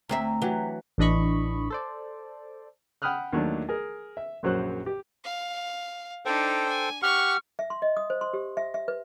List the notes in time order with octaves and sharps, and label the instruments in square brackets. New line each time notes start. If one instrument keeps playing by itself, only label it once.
[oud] D2 C4 E5 [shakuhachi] A#5
[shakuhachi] A#5
[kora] E3 F#3 [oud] G4
[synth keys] A1 E3 D4 D#5 B5 C#6
A4 C5 D5
[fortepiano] F#5 G5 B5 D#6 F6 F#6
D#2 F#3 A3 D4
G#4 A#4
E5
A#1 F#2 F#3 F#4 C5 F#6
G4
[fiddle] F5
[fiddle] D4 D#4 [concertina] A4 C5 G5
[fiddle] G#5
[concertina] G4 F#5 [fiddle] C#6 [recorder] F6
[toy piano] E5
C6
D#5
D#6
C5
C6
G4
E5
E5
B4